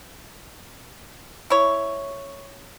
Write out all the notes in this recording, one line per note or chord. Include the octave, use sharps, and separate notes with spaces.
E4 C#5